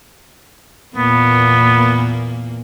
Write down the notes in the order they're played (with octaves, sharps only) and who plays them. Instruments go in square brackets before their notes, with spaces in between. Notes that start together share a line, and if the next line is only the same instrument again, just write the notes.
[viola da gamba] E2 A#2 A#3 [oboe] B3